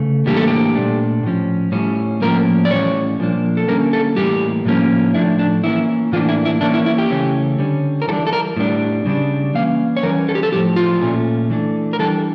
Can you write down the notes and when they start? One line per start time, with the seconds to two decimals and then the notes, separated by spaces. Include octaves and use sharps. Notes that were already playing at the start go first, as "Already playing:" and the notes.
Already playing: C#3 A3
0.26 A2 E3 G3 A#3 D4 G4
0.37 A4
0.48 G4
0.75 A#2 A3 D4
1.23 A2 F3 C#4
1.72 A2 G3 C#4
2.22 A2 F3 A#3 C#4 A#4
2.65 D5
2.70 A2 E3 G3 C#4 C#5
3.19 A#2 F3 A#3 D4
3.57 A4
3.68 D3 G3 A#3 C#4 A#4
3.93 A4
4.16 A2 E3 G3 A#3 G4
4.65 A2 F3 A#3 C#4
5.14 A2 F3 A3 D4 E4
5.39 D4
5.63 E3 A#3 C#4 E4
6.12 A2 E3 A#3 D4 F4
6.29 E4
6.45 E4
6.61 E3 A#3 C#4 D4
6.74 E4
6.86 E4
6.98 G4
7.10 C#3 E3 A3 C#4
7.59 D3 G3 C#4
8.02 A#4
8.08 E3 G3 D4 A4
8.27 A4
8.33 A#4
8.57 A2 G3 D4
9.06 C#3 G3 D4
9.55 E3 A#3 C#4 F5
9.97 C#5
10.03 E3 G3 C#4 A#4
10.29 A4
10.35 G4
10.43 A4
10.52 A2 F3 C#4 G4
10.76 F4
11.01 A#2 A3 C#4
11.50 E3 A3 D4
11.93 A#4
11.99 E3 G3 D4 A4